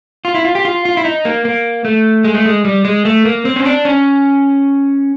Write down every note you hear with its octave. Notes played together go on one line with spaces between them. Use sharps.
F4
E4
F4
G4
F4
F4
E4
D#4
A#3
A#3
A3
G#3
A3
G#3
G3
G#3
A3
A#3
C4
C#4
D4
C#4